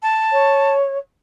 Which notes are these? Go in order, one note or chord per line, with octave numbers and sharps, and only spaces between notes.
A5
C#5